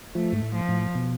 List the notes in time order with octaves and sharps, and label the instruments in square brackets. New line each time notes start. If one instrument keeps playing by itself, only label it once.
[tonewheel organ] F3 [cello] A3
[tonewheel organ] G#2
A2
[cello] F3
[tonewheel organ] A2
B2